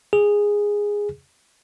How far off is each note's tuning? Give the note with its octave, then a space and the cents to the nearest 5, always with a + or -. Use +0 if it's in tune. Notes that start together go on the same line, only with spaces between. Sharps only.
G#4 -10